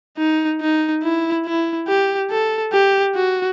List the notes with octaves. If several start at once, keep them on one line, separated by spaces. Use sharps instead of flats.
D#4
D#4
E4
E4
G4
A4
G4
F#4